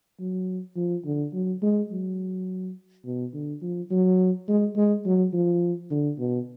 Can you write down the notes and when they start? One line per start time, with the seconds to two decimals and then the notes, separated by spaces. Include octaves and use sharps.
0.20 F#3
0.76 F3
1.05 D3
1.33 F#3
1.63 G#3
1.91 F#3
3.05 B2
3.34 D3
3.62 F3
3.91 F#3
4.48 G#3
4.76 G#3
5.06 F#3
5.33 F3
5.91 D3
6.19 B2